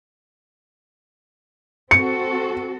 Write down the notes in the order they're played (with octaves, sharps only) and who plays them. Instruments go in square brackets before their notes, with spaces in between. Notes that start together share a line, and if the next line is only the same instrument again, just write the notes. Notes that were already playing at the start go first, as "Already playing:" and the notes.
[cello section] C4 F#4 A4 [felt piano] C#7